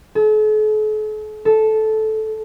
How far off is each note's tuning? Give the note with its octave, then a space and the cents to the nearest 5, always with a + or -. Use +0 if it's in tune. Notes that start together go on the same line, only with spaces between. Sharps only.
A4 -45
A4 -10